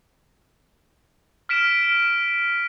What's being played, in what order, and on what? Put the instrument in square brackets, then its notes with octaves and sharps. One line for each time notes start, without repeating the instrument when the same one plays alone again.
[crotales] F6 B6 D7 E7